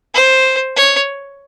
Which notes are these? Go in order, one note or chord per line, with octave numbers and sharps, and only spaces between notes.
C5
C#5